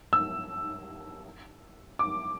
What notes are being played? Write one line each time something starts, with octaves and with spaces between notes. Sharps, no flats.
E6
D6